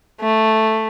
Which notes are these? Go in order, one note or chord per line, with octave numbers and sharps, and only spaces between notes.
A3